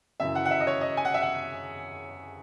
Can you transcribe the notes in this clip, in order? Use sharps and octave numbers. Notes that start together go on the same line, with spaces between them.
F#2 C#3 E3 E5
F#5
F#5
E5
D#5
C#5
D#5
G#5
F#5
E5
F#5